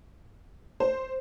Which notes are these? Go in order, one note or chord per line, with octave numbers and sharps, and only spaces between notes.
C5